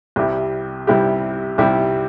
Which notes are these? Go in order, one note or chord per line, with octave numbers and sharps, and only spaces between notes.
C2 C3 G3 E4 G4
C2 C3 G3 E4 G4
C2 C3 G3 E4 G4